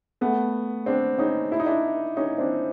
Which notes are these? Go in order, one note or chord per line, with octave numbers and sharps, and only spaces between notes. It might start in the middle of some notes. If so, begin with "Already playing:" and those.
A3 B3
C4 D4
C#4 D#4
E4
D#4
D4 E4
C#4 D#4
C4 D4